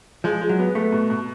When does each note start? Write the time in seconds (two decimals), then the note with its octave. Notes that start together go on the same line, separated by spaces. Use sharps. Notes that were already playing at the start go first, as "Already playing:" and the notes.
0.24 F3 G#3
0.41 G#3
0.49 F#3
0.59 B3
0.75 A3 B3
0.92 B2
1.10 B2